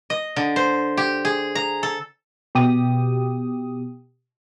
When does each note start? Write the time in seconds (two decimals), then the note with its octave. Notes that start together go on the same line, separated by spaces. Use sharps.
0.10 D#5
0.36 D3
0.56 C5
0.97 G4
1.25 G#4
1.55 A#5
1.83 A4
2.55 B2 G4 D#6